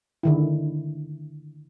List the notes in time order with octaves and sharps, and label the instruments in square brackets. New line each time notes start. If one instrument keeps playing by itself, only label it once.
[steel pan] D3 D#3 E4